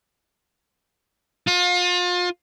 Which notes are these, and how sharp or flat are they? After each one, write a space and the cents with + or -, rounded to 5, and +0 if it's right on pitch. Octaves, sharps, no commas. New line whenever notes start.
F4 +35